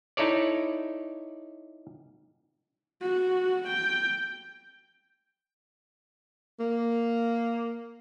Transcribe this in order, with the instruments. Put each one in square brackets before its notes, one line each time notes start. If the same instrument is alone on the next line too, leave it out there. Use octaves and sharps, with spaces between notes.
[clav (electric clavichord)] D#4 E4 A4 C#5 D5
[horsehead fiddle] F#4
G5
[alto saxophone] A#3